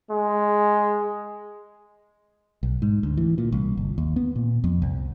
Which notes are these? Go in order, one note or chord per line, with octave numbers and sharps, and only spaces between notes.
G#3
B1
G#2
D2
E3
A#2
C2
G1
D#2
B3
A#2
F2
C2